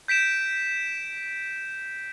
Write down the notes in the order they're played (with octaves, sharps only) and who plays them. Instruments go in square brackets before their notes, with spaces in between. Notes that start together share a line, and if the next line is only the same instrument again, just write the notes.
[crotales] G6 B6 D7 E7